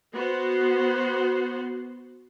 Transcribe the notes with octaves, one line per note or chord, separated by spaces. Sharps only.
B3 F#4 C5